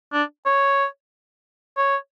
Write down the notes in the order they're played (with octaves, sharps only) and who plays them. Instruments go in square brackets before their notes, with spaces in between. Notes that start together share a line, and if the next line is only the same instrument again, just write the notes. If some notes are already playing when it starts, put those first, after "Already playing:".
[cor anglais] D4
C#5
C#5